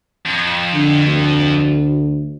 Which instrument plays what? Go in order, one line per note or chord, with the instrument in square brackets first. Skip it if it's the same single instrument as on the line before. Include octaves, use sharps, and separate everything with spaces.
[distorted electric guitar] F2
[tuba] D3
D2